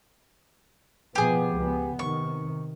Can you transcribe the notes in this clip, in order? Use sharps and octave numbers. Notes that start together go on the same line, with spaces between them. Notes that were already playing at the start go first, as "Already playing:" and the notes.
B2 F3 B3 G4 G#4
C#2 B3
C3 D#3 C#6